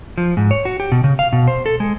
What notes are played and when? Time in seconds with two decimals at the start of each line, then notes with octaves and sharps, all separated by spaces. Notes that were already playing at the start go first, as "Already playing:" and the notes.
0.18 F3
0.37 G#2
0.51 C#5
0.65 F#4
0.80 G4
0.92 B2
1.04 C#3
1.19 F5
1.33 B2
1.48 C5
1.66 A4
1.80 G#3